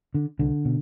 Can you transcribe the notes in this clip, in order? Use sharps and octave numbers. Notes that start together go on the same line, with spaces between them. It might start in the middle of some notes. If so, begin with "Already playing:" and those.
D3
C2 D3
B2